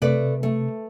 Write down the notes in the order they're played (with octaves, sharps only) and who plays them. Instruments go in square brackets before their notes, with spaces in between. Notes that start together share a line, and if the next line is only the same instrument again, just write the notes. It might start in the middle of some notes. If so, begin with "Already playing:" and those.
[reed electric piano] C3 [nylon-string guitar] A3 B4 D5
[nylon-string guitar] A3